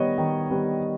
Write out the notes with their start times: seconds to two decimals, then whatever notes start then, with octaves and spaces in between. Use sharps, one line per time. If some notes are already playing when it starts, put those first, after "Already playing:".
Already playing: D#3 G3 B3 C#5 D#5
0.18 D#3
0.50 G3 B3